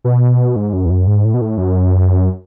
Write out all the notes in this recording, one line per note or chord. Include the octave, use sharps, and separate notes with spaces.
B2
G#2
F#2
E2
F#2
G#2
A2
B2
A2
F#2